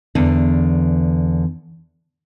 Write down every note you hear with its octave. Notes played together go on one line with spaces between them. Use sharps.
E2 D3